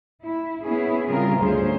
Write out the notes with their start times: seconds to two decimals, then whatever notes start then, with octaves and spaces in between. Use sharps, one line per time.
0.22 E4
0.63 B3 C#4 E4 G#4
1.08 C#3 G3 C4 F4 G#4 A#4
1.41 D2 G2 C#4 G#4 C5